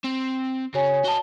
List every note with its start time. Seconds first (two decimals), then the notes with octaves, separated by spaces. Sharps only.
0.04 C4
0.74 C#3 F#4 C#5 G#5
1.04 F#4 D#5 A5 G7